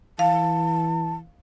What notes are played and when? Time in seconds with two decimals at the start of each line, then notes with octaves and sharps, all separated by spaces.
0.19 E3 F5 A5